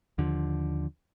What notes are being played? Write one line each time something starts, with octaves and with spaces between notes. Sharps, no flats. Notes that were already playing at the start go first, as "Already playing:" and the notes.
D#2 D3 F3